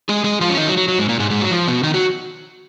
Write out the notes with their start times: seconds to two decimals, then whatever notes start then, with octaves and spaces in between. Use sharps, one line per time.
0.09 G#3 G#4
0.24 G#3 G#4
0.41 F3 F4
0.50 C#4
0.57 D#3 D#4
0.67 F#3
0.77 F#3
0.88 F#3
0.98 G#2 G#3
1.09 A#2 A#3
1.19 G#2 G#3
1.31 G#2 G#3
1.41 F#3
1.51 F3
1.68 B2 B3
1.83 D#3 D#4
1.94 F#3 F#4